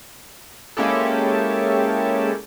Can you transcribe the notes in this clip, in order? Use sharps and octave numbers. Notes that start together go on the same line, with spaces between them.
G#3 A#3 C#4 E4 G4 A4